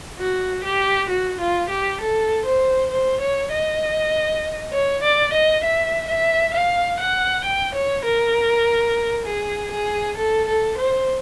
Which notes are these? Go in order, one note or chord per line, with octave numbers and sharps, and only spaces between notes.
F#4
G4
F#4
F4
G4
A4
C5
C5
C#5
D#5
C#5
D5
D#5
E5
E5
F5
F#5
G5
C#5
A#4
G#4
G#4
A4
A4
C5